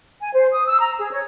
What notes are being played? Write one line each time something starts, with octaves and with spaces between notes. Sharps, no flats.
G#5
C5
D#6
E6
A#5
G#4
C#5